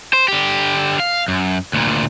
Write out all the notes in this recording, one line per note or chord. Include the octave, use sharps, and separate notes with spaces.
C5
D3 G4
F5
F#2
D2 A#2